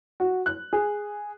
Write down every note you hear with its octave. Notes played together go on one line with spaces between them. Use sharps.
F#4
F#6
G#4